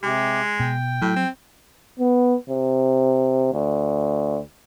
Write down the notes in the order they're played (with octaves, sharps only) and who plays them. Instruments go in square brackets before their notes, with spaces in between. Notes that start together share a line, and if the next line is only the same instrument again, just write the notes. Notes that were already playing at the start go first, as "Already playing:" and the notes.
[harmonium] C3 G4 [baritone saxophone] G#3
[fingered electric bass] B2 [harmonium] G5
[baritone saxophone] A2 [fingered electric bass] F#3
[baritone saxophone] C4
[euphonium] B3
C3
D2